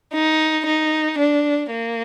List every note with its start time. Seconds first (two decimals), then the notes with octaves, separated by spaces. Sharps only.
0.14 D#4
0.66 D#4
1.19 D4
1.70 A#3